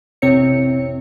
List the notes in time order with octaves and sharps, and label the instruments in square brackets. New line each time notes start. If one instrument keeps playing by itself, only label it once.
[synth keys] A1 F2 C3 C4 C#5 C#7